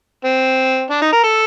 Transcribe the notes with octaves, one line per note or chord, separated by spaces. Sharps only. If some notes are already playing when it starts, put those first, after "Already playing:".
C4
D4
D#4
A#4
A4